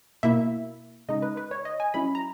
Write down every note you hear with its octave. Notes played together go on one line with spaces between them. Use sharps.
B2 A#3 E4 E5
C#3 G#3 D#4 D#5
B4
B4
C#5
D#5
G#5
F#3 C#4 E4 B5
A#5